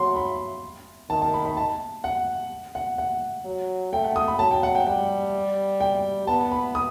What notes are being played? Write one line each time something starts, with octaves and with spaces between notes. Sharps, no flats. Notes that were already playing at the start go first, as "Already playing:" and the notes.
Already playing: F#3 C6
B5
D#3 A5
A5
B5
B5
A5
F#5
F#5
F#5
F#3
A3 G5
F#5
D#6
B5
F#3 A5
G5
F#5
G5
G3 G5
G5
B3 A5
B5
D#6